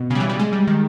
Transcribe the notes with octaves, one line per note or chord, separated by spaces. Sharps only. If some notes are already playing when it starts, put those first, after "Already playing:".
Already playing: B2
C#3
G3
E3
G3
G#3
G3
D#3